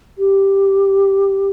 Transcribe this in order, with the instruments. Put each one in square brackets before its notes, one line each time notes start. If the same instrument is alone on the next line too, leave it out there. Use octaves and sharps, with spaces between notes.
[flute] G4